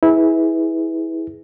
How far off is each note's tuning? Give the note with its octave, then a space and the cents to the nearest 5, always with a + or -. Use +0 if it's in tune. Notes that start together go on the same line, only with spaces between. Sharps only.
E4 -20 G#4 +0 B4 +0